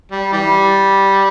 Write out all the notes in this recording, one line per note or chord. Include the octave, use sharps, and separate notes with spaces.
G3
E3 G3